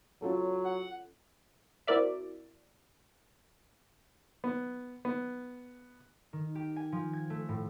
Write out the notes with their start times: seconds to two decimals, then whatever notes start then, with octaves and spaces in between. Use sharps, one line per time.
0.22 F#3 C#4 F4 A4
0.65 F#5
1.87 C4 E4 F#4 A#4 D5 E5
4.44 B3
5.05 B3
6.33 D#3
6.55 G4
6.76 G#5
6.92 F3
7.13 G#6
7.30 A3
7.49 A2